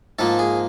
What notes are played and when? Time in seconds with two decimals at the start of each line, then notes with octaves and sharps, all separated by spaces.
0.19 G#2 F3 A#3 A4
0.39 G#4